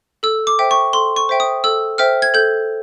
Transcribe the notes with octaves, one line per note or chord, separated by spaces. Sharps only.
A4 E6
D6
C5 E5 G5
C#6
A4 C6
C#6
C5 E5 G5
D#6
A4 E6
C5 E5 G5 F6
G#6
A4 G6